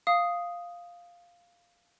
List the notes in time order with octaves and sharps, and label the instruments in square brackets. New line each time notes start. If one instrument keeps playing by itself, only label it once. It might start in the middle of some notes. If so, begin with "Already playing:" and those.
[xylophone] F5 D#6